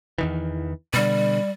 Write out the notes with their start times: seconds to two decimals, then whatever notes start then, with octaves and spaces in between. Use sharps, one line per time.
0.18 E2 D#3 E3
0.94 B2 D3 G3